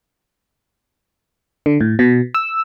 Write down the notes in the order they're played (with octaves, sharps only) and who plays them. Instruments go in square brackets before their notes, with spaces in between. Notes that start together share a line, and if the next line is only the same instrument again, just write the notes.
[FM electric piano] D3
A2
B2
E6